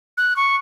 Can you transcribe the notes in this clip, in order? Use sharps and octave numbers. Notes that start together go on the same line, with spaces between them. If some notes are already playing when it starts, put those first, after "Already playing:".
F#6
C#6